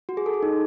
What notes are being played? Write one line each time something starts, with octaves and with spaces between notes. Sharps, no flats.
F#4
G#4
A4
G#4
D#4